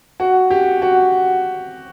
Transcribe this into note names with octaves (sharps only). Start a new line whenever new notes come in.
F#4
G4
F#4